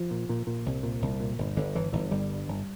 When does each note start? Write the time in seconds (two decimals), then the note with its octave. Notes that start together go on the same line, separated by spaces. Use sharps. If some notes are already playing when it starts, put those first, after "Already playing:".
Already playing: F3
0.11 A#2
0.29 A#2
0.47 A#2
0.66 C2
0.83 A#2
1.02 C2
1.20 A#2
1.38 G1
1.56 G1 D3
1.75 G1 E3
1.93 G1 E3
2.11 G1 G3
2.30 G2
2.48 G1